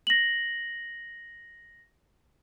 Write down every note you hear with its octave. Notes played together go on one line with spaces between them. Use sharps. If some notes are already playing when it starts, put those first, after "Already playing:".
A#6 F#7